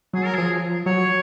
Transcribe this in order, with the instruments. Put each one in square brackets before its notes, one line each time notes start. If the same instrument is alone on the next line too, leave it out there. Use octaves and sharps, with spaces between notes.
[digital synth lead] F#3 [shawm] G#4
[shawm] A#4
[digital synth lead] F3 [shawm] G#4
[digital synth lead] F#3 [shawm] C#5